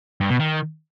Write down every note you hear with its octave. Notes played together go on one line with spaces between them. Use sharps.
G2
B2
D#3